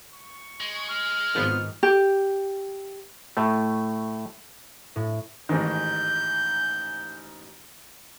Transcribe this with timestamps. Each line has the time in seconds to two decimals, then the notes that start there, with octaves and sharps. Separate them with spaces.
0.15 C#6
0.60 G#3
0.89 F6
1.35 G#1 G#2 D#3 F3 B3
1.83 G4
3.37 A2 A3
4.96 A2
5.49 A1 G#2 D#3 G6